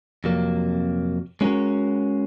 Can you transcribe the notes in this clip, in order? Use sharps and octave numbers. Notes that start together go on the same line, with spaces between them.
F2 C3 F#3 A#3
G#3 C#4 F#4 A#4 C#5